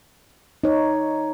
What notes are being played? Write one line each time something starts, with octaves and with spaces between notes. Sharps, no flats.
D#4 C#5